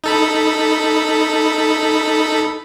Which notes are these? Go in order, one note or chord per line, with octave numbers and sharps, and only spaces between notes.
D#4 A4 B5